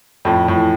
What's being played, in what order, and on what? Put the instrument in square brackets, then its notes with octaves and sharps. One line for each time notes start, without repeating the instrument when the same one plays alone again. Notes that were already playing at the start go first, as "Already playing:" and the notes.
[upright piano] F2 [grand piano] A2
[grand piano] A2
[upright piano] E3